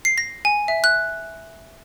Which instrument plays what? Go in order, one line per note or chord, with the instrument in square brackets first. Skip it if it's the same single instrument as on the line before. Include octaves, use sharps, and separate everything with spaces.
[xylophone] C7
A#6
G#5
E5
F#6